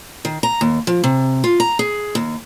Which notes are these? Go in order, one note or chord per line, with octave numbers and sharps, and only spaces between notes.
D#3
A#5
D#2
F3
C3
F4
A#5
G#4
D#2